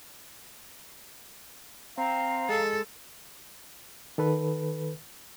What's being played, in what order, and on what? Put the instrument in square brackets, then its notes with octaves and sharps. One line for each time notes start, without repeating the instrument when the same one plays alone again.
[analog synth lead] C4 [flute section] F5 A#5
[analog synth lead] G#3 [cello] A4
[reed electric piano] D#3 A4 B4